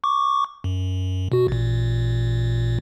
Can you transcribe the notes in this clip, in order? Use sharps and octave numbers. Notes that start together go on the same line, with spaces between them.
C#6 D6
F#2
B2 F#4
A1 A#2